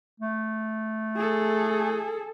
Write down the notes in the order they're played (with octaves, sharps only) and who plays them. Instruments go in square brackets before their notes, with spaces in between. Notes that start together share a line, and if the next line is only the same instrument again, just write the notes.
[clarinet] A3
[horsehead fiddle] G#4 A4